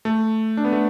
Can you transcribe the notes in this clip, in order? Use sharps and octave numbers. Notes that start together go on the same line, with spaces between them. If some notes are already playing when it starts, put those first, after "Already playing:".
A3
D4
B3
A3